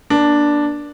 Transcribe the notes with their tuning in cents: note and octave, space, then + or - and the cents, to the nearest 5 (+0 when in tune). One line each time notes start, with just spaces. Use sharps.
A#3 +40 D4 +0